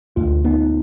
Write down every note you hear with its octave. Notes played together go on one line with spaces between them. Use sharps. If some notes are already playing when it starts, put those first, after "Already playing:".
D2 F4
B3 D#4